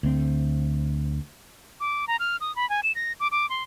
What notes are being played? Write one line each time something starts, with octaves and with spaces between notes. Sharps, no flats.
D2 C4
D6
A#5
F6
D#6
B5
G#5
E7
A#6
D6
D6
C6